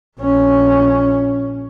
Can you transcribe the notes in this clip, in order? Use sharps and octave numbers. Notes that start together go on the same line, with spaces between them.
A#1 C#4